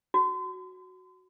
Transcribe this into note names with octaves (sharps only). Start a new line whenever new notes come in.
F#4